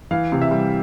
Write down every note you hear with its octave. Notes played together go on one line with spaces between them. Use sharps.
E3 F5
C3
E5
G3